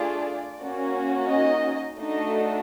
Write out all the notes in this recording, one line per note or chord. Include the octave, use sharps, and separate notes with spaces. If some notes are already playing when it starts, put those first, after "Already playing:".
Already playing: A3 D4 F4 G#4 D5
A#3 C#4 F#4
D#4 D#5
A3 D4 D#4 F#4 A4 D#5